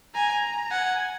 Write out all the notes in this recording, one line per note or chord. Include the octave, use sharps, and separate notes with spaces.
G#5 A#5
F#5 G#5